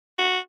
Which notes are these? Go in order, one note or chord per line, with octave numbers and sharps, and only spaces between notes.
F#4